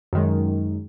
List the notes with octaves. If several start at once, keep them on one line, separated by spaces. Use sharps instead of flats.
F#2 D#3 G#3